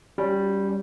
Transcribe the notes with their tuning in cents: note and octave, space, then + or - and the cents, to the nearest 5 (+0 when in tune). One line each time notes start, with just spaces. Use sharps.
G3 +0 C#4 +15 F#4 -30